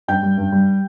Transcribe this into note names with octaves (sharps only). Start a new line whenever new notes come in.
G2 G5 G6
G3
G2
G3